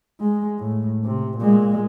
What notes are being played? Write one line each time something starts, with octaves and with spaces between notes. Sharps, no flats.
G#3
A2
C3
A#2 G#3